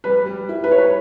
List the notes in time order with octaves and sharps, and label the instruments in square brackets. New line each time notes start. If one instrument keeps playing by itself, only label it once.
[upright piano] G3 [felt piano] B4
[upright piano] G3
E4
[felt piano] B4
[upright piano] E4 [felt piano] C#5
[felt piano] B4